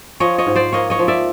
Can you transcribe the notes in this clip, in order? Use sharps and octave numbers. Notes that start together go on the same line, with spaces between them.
F3 C#5 D#5
C#5 D#5
G#2
C5 D5
A#3 C#5 D#5
C#5 D#5
F3
D5 E5